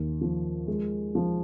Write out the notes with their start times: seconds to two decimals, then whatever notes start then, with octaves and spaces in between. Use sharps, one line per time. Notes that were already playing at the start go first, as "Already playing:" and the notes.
Already playing: D#2
0.21 F3
0.67 G#3
1.15 F3